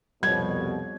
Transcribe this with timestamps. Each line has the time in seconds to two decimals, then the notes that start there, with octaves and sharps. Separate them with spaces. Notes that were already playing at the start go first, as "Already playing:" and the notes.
0.23 C2 F2 B2 G3 C#5 G#6